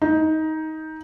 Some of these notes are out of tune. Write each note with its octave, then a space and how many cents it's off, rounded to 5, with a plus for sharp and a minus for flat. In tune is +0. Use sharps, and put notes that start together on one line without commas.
D#4 +15